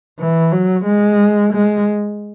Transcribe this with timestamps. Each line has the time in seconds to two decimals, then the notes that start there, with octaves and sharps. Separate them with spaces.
0.19 E3
0.52 F#3
0.85 G#3
1.53 G#3